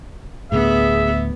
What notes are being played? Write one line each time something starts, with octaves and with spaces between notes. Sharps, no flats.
D2 A2 B3 G#4 E5